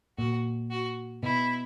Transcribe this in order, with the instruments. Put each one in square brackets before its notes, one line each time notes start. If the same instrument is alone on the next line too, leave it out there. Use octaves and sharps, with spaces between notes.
[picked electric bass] A#2 [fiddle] F#4
[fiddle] F#4
[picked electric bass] B2 [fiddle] E4